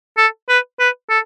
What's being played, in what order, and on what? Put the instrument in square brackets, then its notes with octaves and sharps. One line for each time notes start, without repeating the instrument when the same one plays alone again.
[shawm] A4
B4
B4
A4